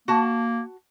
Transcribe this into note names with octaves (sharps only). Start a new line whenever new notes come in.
A#3 F#4 A5